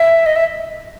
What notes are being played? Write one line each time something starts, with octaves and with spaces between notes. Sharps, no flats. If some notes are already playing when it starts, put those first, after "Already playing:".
Already playing: E5
D#5
E5